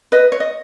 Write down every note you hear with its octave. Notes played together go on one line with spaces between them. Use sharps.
B4 D#5
C#5
D#5